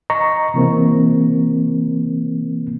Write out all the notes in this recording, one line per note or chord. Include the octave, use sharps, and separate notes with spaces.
D#5 A#5 C#6
C3 E3 A#3 C4